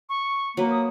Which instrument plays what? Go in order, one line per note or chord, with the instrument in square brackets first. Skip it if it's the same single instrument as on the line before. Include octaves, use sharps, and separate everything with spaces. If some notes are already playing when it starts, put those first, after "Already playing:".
[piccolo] C#6
[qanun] F#3 B4 [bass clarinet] A#3
[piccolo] D#6